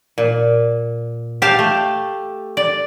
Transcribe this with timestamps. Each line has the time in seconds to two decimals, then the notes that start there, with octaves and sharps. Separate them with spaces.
0.18 A#2
1.42 G4 F5 A5
1.59 A3
2.57 D5